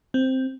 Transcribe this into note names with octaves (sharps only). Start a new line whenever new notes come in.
C4